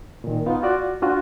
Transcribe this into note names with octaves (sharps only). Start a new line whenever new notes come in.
A#2 D#3
B3 D#4 F4 F5
F4 F#4 D5
D4 F4 F#4